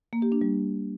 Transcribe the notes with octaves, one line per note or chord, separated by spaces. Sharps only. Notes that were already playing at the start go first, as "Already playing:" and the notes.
A#3
G4
D4
G3